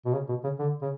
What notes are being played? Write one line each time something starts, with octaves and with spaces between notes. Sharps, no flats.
B2
C#3
B2
C#3
D3
C#3